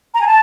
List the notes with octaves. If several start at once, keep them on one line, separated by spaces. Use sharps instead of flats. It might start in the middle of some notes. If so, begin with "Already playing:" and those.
A#5
G#5
A5